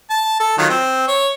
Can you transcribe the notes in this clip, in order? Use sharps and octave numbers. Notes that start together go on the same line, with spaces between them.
A5
A4
D#3 F#3 F4
C4
C#5